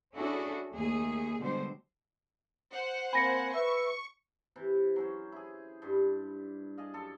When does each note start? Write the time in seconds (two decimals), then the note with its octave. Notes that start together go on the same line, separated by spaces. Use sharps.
0.16 C#4 D4 E4 F#4 G#4 A4
0.74 D#2 A3 A#3 G#4
1.40 B2 D3 G3 G#3 C5
2.71 C5 F#5
3.13 A#3 C4 G#5 B5 A#6 C#7
3.54 B4 E5 C#6
4.56 C3 E3
4.96 F#3 C#4 C5
5.32 E4 G#4
5.82 G2 G3 C6
6.77 G#4 D5 D#5 F5
6.94 F#2 A4 C6